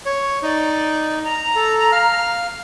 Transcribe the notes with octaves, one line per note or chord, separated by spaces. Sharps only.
C#5
D#4 D5
A#5
A4
F5 F6